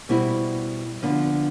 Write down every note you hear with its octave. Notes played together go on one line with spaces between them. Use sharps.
B2 G3 C4 E4
D3 F3 B3 D4 F4